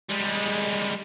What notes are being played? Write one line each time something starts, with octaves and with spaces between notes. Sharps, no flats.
G3 G#3